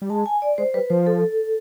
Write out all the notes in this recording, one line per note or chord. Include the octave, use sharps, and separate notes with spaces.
G3
G#3 A5
G#5
D5
G#3 C5
G3 B4
F3 C5
A4